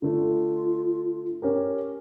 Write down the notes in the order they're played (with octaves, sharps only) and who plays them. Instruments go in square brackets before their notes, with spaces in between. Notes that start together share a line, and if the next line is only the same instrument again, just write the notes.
[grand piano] D3 A3 [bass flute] F4
[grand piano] C#4 G4 A#4